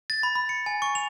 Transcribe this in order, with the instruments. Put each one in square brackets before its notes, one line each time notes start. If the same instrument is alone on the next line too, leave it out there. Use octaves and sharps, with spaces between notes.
[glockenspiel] A6
B5
B5
C#7
G#5
C#6
F7